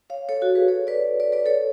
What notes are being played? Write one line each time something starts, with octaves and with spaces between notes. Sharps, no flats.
C#5 F5
A4 C#5
F#4 A4
G#4 B4
A4 C#5
B4 D5
B4 D5
B4 D5
A4 C#5